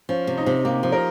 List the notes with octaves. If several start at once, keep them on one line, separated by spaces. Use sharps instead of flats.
F3 C#4
C3
D#4
C3
A#3 G4
F3
A#4